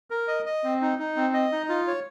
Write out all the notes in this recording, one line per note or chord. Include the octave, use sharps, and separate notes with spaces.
A#4
D#5
D#5
C4
D#4
D#4
C4
D#5
D#4
F4
C#5